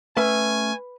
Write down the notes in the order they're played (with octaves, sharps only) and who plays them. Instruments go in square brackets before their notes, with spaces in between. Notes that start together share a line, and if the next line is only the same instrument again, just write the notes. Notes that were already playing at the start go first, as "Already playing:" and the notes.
[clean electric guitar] A3 C#4 E5 [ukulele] B4 [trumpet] G#5